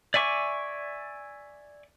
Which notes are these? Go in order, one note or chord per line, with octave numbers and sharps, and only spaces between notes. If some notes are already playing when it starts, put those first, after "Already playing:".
D5 E5 G#5 C#6 D6